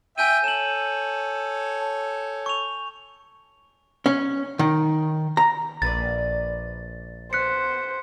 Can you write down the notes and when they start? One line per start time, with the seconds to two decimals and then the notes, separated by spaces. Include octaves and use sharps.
0.18 E5 G5 G#5 G6 D#7
0.44 A4 C#5 E7 F#7
2.46 C#6 F7
4.06 C#4
4.59 D#3
5.37 A#5
5.82 A#1 A#3 B4 D5 A6
7.33 B3 C5 F#6 B6 C#7